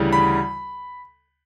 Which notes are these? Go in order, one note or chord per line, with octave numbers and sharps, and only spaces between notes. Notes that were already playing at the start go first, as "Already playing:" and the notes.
Already playing: D2 C#3 E3 G3
B5